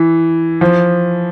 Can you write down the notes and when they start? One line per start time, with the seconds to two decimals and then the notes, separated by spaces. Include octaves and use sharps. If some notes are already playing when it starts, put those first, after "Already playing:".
Already playing: E3
0.61 F3